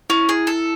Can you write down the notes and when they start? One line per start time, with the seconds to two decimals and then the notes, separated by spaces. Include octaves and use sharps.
0.10 C#4 E4
0.29 G#4
0.47 A4